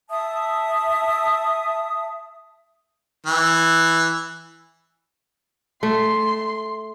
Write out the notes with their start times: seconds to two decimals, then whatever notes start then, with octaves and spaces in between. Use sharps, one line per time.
0.10 E5 A5 D#6
3.27 E3
5.83 A3 C6